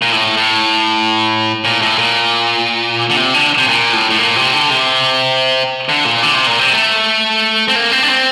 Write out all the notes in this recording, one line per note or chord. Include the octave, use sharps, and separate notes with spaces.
A#2
A2
A2
A#2
A2
A#2
D3
C3
D3
C3
A#2
A2
A2
A#2
C3
D3
C3
D3
A#2
D3
C3
A#2
C3
A3
C4
A#3
C4
D4
C4